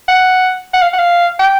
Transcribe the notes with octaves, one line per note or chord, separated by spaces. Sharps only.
F#5
F#5
F5
F#5
F5
G5